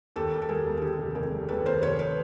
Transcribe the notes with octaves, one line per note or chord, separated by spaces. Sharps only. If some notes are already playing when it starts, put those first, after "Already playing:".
D#2 G4 A4
D#2
A4
G3 G#4 A#4
D#2
G#4
D3 G4 A4
F1
F1 G#4 A#4
G3
D#2 A4 B4
D#2 A#4 C5
F1 B4 C#5
B4 C#5